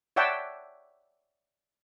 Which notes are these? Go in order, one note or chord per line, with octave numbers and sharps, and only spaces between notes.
C#5 D5 E5 F#5 G5 A5